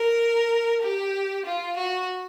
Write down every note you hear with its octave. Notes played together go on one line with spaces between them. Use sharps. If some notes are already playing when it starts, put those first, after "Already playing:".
Already playing: A#4
G4
F4
F#4